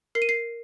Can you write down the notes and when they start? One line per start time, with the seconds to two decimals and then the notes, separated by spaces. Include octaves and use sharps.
0.15 A#4 C7
0.22 D#7
0.29 C7